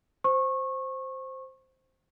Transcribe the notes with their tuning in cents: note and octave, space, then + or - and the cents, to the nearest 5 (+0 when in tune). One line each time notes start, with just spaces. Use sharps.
C5 +0 C#6 -25